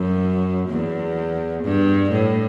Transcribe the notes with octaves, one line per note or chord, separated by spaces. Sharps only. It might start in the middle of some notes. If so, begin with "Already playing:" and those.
Already playing: F#2
E2
G2
A2